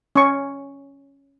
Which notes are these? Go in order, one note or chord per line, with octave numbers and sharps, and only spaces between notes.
C#4 C#6